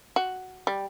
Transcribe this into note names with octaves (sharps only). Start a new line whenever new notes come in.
F#4
G3